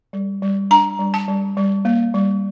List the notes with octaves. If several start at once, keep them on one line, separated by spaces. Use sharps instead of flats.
G3
G3
D4 A#5
G3
A5
G3
G3
A#3
G3